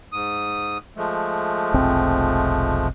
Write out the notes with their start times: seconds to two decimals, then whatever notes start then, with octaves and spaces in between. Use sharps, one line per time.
0.12 G#2 D#6
0.97 F3 G#3 A3
1.74 F1 B1 C4